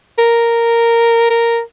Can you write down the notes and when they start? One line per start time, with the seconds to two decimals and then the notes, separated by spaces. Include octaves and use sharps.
0.18 A#4
1.30 A#4